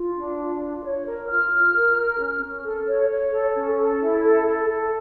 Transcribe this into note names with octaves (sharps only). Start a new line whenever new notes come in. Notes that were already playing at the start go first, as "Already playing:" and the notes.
Already playing: F4
D4
F4
F4
C#5
A#4
F4 F6
F4
A#4
A#4
C#4
C#4
A4
C#5
C#5
A4
C#4
A4
E4
A4
A4
A4